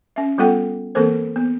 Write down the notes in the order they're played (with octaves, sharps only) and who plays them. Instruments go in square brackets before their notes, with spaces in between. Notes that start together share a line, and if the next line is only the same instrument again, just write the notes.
[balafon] C#4 E5
G3 B3 F4 A4 F#5 G5
E3 A#3 C4 A4 A#4 C5
B3